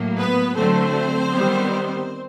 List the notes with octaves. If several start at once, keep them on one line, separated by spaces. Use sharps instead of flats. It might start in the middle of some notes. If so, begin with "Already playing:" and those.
Already playing: A2 F#3 A#3
B3 B4
D3 F#3 A3 C4 C5
D#3 G3 B3